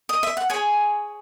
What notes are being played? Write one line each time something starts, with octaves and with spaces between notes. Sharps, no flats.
D#5
E5
F#5
G#4 C#5 G#5